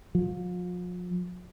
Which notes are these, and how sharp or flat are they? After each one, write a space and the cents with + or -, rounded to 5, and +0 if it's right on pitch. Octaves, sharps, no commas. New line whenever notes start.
F3 +40